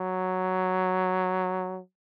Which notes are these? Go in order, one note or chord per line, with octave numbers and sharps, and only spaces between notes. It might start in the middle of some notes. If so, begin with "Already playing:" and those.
Already playing: F#3